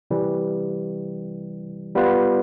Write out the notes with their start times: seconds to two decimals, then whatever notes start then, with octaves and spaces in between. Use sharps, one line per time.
0.11 C3 E3 G3
1.95 G3 B3 F4 B4